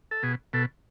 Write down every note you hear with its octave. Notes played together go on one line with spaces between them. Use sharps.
A4
B2 G#4
B2 A4